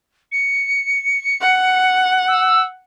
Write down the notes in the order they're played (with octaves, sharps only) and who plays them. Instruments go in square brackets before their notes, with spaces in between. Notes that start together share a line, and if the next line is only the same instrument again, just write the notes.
[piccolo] C#7
[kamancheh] F#5
[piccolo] E6